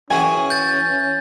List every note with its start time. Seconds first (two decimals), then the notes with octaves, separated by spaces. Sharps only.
0.10 E3 C#4 F#4 G#4 G#5
0.50 G6 A6